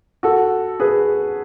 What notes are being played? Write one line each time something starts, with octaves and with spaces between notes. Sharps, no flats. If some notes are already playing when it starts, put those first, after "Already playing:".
F#4 A4
G#4 B4